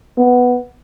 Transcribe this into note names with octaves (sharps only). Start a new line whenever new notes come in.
B3